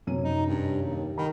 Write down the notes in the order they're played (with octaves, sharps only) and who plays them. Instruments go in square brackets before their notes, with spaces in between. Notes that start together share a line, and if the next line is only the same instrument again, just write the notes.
[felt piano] F#2 C3 D#7
[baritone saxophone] D#4
G2
D#2
[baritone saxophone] D#3 [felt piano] B5